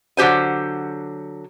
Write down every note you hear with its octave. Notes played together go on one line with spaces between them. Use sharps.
D3 F#3 G4 C5 G#5